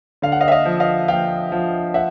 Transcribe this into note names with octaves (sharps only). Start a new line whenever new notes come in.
D3 F5
F#5
D#5 F5
E5
D#5 F5
F3
D#5 F5
F3 F5 G5
F3
E5 F#5